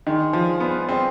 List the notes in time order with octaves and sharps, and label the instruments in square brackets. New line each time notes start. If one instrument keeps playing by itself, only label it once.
[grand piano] D#3 [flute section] G#4 D5 G#5 C6
[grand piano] F3
B3
[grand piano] C4 [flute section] G#4 D5 G#5 C6